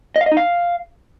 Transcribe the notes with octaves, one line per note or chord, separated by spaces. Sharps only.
D#5
F5
D#5
D#4
F5